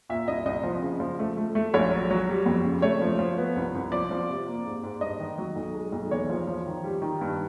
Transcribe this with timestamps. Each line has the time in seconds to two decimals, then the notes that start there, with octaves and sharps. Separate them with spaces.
0.10 A#2 E5
0.27 C2 D#5
0.45 C2 D#5
0.64 F3
0.82 C#3
1.00 F3
1.19 A3
1.37 A3
1.55 A3
1.74 A#1 C#5
1.91 F#3
2.11 F#3
2.29 G3
2.46 F2
2.64 C#3
2.82 A3 C#5
3.02 F3
3.19 F3
3.38 B3
3.56 C2
3.75 C2
3.92 F3 D5
4.11 F3
4.29 C3
4.48 A#3
4.66 G#2
4.83 G#2
5.01 G2 D#5
5.19 D#3
5.38 F#3
5.56 B1
5.75 G#3
5.92 B1
6.11 E2 C#5
6.30 F3
6.47 F3
6.66 D#3
6.84 G3
7.02 D#3
7.21 G2